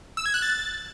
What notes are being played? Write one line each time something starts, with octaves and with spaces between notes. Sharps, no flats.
E6
G#6
F#6
A6